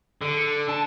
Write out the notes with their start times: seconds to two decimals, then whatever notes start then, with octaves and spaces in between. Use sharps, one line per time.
0.22 D3
0.69 A5